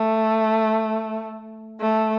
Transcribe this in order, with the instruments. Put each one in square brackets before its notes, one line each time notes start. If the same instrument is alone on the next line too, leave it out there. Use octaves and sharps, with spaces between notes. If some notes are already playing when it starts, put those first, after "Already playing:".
Already playing: [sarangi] A3
A3